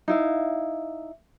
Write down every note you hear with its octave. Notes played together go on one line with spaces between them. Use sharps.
D#4 E4 F5